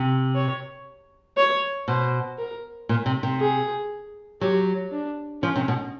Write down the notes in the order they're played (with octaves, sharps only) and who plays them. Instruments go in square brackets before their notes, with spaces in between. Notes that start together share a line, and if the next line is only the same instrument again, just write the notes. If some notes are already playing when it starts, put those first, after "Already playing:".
Already playing: [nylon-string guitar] C3
[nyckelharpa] C#5
C#5
[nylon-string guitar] B2 [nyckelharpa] C5
[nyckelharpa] A#4
[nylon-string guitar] A#2
C3
C3
[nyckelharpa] G#4
[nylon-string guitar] F#3 [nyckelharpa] G4
[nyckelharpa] D4
[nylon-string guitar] F3 [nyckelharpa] C#4
[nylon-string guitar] C3
B2